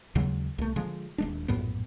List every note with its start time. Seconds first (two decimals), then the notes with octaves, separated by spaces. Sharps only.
0.15 D#2 C#3 F#3 G#3
0.58 C2 A3
0.76 D3 F3 G#3
1.18 D#1 G#3 D4
1.48 A#1 F#2 A2 B3